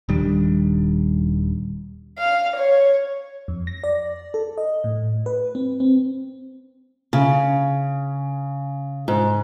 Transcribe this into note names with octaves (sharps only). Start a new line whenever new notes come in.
D#1 D#3 G3 D4
F5
C#5
F2
A#6
D5
A4
D#5
A2
B4
C4
C4
C#3
G#2